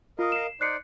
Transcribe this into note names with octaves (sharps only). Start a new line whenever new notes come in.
F4 A#4 D#5 F5 D#6
C7 E7
D#4 C5 D5 F#6 C7 C#7